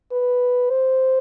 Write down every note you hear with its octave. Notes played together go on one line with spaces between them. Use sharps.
B4
C5